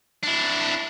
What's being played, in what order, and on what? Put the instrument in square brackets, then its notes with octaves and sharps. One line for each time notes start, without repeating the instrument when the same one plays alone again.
[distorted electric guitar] D4 E4